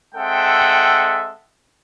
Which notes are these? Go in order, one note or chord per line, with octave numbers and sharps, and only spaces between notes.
G#3 C4 A4 E5 F#5 G5